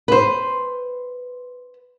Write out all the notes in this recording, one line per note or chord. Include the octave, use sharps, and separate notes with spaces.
B4 C5